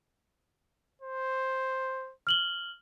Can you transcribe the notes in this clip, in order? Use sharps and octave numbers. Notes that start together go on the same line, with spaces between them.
C5
F6 F#7 G7